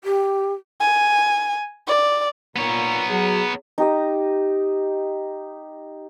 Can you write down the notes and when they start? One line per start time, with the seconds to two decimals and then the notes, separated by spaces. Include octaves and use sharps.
0.04 G4
0.80 G#5
1.87 D5
2.56 A#2 B3 C#5 A#5
3.09 F#3 G#4
3.78 D#4 G4 D#5